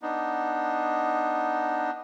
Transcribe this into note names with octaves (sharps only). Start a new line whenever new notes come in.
B3 D4 D#4